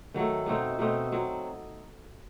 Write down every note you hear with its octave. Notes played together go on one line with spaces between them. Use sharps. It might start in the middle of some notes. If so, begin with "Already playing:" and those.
D#3 F#3 A3
B2 A3 C4 D#4
B2 A3 C4 D#4
F#3 C4